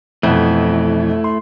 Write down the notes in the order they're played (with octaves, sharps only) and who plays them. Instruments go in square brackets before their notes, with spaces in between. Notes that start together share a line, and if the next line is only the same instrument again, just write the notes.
[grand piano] F2 B2 E3 [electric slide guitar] A3 E4
[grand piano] C6